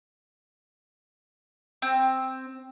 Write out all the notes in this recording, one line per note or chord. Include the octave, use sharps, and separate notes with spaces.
C4